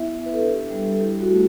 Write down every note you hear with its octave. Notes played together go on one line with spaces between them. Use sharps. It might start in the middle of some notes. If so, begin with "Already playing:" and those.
Already playing: B3 E4 E5
B3
B4
A4
D4 G4
G3
A4
E4 G4
F#4
A3